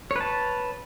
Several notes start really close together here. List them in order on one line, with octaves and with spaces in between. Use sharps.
C#5 B4 A5